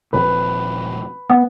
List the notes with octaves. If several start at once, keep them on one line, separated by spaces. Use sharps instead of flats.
D#1 F3 C4 B4
B3